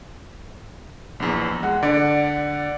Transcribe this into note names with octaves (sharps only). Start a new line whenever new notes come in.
A#1 E2
G#3 F#5
D3 D5